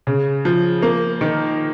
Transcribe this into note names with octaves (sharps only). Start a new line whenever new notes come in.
C#3
F3
A#3
D#3